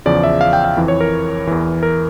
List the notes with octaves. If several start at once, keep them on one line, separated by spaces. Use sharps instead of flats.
E2 C#3 F3 D5
E5
F5
G5
F5
F2 E3
C#5
A#4
E2 E3
A#4